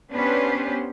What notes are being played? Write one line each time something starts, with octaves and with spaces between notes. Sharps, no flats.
B3 C#4 D4 G4 B4 C5